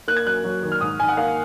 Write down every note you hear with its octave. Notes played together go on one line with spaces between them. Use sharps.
A#3 F#6
G#6
F#2 F#6
F#3
D#3
F6
G#2 D#6
G#2 G#5
F#5
A#3 F5